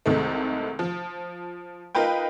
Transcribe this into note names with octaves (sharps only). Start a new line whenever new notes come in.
C2 C3 D#3 G#3 A3
F3
D#4 F4 A#4 B4 G5